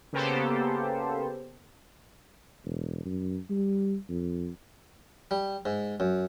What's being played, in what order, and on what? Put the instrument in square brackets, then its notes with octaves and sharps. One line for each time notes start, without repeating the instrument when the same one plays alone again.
[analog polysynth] C#3 A#3 B3 G4 A4 C5
[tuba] E1
F#2
G3
F2
[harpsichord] G3
G#2
F#2